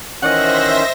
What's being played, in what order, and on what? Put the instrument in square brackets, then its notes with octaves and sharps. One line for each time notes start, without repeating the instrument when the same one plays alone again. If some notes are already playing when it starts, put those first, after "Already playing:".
[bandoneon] D#3 E3 C#4 [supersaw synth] C5 E5 A#6 [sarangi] D#5 [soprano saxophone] F#5